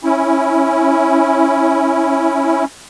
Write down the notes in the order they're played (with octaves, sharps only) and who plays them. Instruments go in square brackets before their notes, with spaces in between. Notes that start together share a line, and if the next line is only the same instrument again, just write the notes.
[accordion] C#4 E4